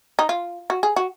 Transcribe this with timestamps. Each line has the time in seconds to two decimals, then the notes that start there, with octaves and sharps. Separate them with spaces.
0.19 D#4
0.29 F4
0.70 F#4
0.83 G#4
0.96 F#4